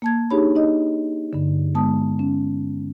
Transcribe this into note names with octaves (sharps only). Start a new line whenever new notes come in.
A#3 A5 G#6
D4 D#4 G4 G#4 C#5 B5
D#4 D#5
G2 D3
G#3 B3 A5 D#6
C#4